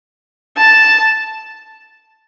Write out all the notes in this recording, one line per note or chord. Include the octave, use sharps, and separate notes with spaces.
A5